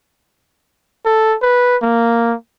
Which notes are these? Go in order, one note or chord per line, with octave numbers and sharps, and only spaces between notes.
A4
B4
A#3